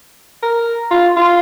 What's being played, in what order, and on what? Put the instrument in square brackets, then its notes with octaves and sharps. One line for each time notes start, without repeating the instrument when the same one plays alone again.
[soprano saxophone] A#4
F4
F4